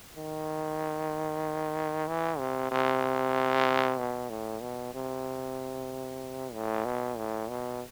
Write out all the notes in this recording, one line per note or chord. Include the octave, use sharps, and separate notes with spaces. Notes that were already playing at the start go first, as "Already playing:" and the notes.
D#3
E3
C3
C3
B2
A2
B2
C3
A2
B2
A2
B2